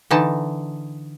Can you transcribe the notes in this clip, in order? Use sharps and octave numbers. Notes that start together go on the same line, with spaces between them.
D3 E3 D#4 A5